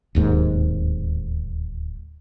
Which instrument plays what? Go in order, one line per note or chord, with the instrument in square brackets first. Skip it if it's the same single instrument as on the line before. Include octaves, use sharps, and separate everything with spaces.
[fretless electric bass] D1 D#2 G#2